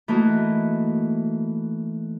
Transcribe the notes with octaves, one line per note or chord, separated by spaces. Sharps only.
E3 A3 A#3 D#4 F#4